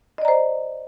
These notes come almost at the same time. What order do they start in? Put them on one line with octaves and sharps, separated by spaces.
D#5 D5 A#5 C5